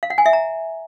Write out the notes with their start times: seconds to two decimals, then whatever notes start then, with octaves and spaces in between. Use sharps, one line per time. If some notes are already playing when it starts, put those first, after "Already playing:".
0.03 F5
0.10 F#5
0.18 G#5
0.26 E5
0.33 A#5